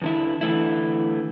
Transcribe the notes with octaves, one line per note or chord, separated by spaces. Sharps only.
E2 D3 E4
D3 E3 A3 E4